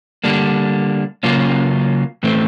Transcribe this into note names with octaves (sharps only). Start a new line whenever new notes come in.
D3 G3 A#3 D4
C#3 F#3 A#3 C#4 F4
A2 E3 A3 C4